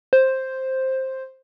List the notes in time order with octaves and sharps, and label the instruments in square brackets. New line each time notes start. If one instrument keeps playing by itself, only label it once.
[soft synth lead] C5